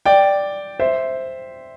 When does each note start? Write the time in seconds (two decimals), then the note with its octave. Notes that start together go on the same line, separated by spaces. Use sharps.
0.05 D5 G5
0.79 C5 E5